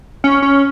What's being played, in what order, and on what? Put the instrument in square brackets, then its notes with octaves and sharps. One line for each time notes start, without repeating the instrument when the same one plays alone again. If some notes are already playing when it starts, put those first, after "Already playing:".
[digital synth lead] C#4
C#4